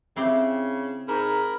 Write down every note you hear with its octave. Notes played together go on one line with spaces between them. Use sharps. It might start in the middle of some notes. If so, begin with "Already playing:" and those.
C#3 C4 E4 G4
G#2 A#4 B5